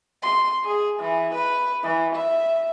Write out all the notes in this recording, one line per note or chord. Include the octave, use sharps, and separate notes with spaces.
C6
G#4
E3
B4
E3
E5